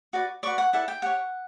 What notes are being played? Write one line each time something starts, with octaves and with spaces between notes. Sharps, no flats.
F#4 B4 D5
F#4 B4 D5 C#6
F#5
E4 A4 D5 F#5
G5
G4 C#5 F#5